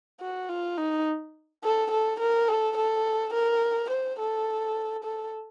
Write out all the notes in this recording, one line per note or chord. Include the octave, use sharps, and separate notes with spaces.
F#4
F4
D#4
A4
A4
A#4
A4
A4
A#4
C5
A4
A4